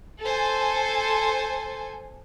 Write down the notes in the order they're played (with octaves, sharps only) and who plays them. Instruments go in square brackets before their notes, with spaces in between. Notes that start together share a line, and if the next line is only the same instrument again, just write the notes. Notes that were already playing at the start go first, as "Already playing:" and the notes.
[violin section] A4 C5 G#5